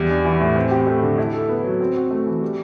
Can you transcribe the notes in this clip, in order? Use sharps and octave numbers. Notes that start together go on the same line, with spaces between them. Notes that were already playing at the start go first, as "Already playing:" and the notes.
Already playing: E2 G3
D4
E3
A2
C4
G4
A3
D3
E4
A4
B3
F#3
C4
F#4
A3
E3
G3